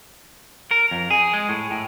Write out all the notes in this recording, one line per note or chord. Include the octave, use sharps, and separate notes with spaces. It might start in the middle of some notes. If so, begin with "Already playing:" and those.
A#4
F2
G#4
G#3
A2
A2